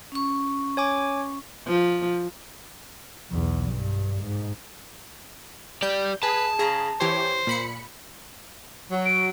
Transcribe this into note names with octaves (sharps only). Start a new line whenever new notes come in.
C#4 C#6
C#5 G#5 D6
F3
B1 E2
G2
G#2
G4 D5 G6
G#4 B4 A5
C#3 G#4 A#5
E3 G4 C5 C#5
A#2 B5 C#7
F#3
D7